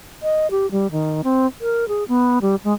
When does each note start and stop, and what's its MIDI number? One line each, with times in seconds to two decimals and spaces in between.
0.23 0.47 75
0.51 0.70 67
0.71 0.91 55
0.91 1.22 51
1.24 1.47 60
1.61 1.87 70
1.88 2.04 68
2.08 2.39 59
2.42 2.56 55
2.65 2.73 56